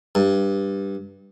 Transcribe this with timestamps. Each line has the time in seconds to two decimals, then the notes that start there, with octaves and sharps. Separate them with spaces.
0.15 G2